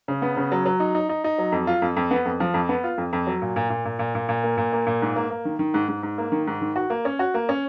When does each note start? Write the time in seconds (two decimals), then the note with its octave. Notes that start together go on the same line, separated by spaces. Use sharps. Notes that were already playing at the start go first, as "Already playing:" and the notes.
0.08 C#3
0.22 B3
0.37 C#3
0.52 F#3
0.66 F#3
0.80 D#4
0.95 D#4
1.09 D#4
1.24 D#4
1.38 F#3
1.52 F2
1.67 F4
1.82 F2
1.96 F2
2.11 B3
2.25 F2
2.40 F3
2.54 F2
2.69 B3
2.84 F4
2.98 F2
3.13 F2
3.27 F#3
3.42 A#2
3.56 A#2
3.70 A#2
3.85 A#2
3.99 A#2
4.15 A#2
4.29 A#2
4.43 A#3
4.57 A#2
4.73 A#3
4.87 A#2
5.02 G#2
5.16 A#3
5.30 A#3
5.45 D#3
5.59 D#3
5.74 G#2
5.88 G#2
6.03 G#2
6.18 A#3
6.32 D#3
6.47 G#2
6.61 D#3
6.76 F#4
6.90 A#3
7.05 C#4
7.19 F#4
7.34 A#3
7.49 C#4